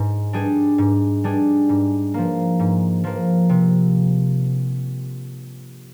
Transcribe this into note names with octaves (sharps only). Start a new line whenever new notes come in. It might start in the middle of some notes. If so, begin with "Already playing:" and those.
Already playing: G#2
G3 D4 G#4
G#2
G3 D4 G#4
G#2
F3 A#3
G#2
F3 A#3
C3